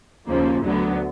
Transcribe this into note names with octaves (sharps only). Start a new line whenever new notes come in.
D#2 C#3 F3 A#3
D2 D3 F#3 B3